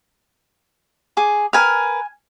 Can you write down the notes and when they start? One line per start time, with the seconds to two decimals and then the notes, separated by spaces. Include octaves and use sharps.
1.17 G#4 G#5 D6
1.53 A#4 B4 G#5 F6